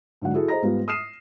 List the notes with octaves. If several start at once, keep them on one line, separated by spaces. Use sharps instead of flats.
G#2 D3 F#3 F#5
E4 F#4 G#4 A4
G#4 C5 D#5 A#5 A#6
G#2 G3 B3 F4
D#6 F6 C7 D#7 E7